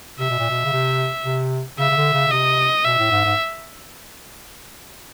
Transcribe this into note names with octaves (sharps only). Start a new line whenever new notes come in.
C3 E5
B2
A#2
B2
C#3
C3
C3
C#3 E5
C#3
D3
C#3
C#3
C3 D#5
B2 E5
A2
G#2
G#2